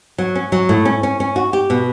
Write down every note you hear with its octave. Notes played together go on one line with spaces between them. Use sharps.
F#3
C#4
F#3
A2
C#4
C#4
C#4
F#4
G4
B2